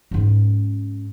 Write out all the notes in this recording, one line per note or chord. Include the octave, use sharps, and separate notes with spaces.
G#2 C#4